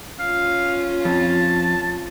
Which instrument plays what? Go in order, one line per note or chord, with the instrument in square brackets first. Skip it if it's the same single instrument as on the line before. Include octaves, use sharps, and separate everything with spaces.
[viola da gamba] C#4 F4 [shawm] F5
[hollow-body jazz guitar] F2 [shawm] A5